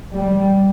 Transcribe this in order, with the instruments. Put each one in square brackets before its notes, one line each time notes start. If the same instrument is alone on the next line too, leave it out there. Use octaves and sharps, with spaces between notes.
[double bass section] G3